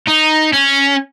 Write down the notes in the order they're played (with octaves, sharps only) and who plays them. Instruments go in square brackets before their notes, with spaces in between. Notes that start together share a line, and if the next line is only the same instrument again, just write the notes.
[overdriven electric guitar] D#4
C#4